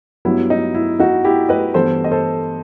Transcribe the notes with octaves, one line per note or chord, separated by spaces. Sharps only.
G2 F#3 B3 E4
D#4
E4
D#4 F#4
E4 G4
B4 D#5
G2 E3 B3 A4 C5
D#5
A4 C5